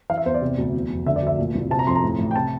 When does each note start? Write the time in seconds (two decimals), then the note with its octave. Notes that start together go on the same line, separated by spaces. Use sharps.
0.10 E3 F5
0.18 E5
0.26 E2 C5
0.34 D5
0.41 C3
0.58 D2
0.74 E2
0.90 F1
1.06 D3 E5
1.16 D5
1.22 D2 E5
1.39 A#2
1.55 C2
1.70 C3 A5
1.79 A#5
1.87 F2 C6
1.95 A#5
2.03 A2
2.18 A1
2.31 G5
2.35 C3 A5